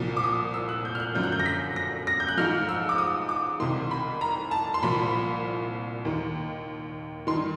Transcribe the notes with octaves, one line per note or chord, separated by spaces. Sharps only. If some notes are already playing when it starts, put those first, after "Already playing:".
Already playing: C2 A#2 F3
D6
D#6
E6
F#6
G6
F6
F#6
F#2 D3 F3 G6
F#6
G6
A#6
B6
A#6
A#6
G6
F#6
G#2 F3 F6
E6
D6
D#6
D6
C2 C3 D#3 C6
B5
A#5
A5
C6
C2 A#2 F3 B5
D#2 D#3
G2 D#3 C6